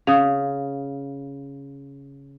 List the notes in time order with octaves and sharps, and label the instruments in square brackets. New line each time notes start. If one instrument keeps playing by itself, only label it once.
[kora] C#3 [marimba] F5 D#6